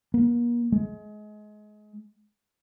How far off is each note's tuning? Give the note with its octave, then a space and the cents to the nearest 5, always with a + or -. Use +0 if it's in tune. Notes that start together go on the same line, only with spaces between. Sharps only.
A#3 +40
G#3 +25